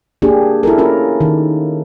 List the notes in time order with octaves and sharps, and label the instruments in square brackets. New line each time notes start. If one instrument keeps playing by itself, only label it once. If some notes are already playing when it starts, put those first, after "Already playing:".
[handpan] A#3 D4 G4 G#4
E4 A4 A#4
C#4 F4 A#4
D#3